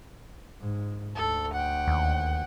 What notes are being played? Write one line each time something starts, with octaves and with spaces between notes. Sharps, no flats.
G#2
D2 A4
F#5 G5
D#2